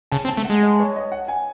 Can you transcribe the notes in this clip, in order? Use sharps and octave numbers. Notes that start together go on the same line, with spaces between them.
C#3 A5
C4
A5
A3
F#5
G#3
D#5
C#5
D#5
F#5
G#5